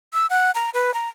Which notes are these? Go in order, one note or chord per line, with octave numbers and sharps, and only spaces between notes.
E6
F#5
A#5
B4
A#5